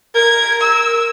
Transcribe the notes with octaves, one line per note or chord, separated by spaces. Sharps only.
A#4 G#6
E6